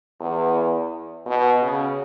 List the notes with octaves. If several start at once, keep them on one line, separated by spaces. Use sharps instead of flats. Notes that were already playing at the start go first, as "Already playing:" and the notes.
E2
B2
C#3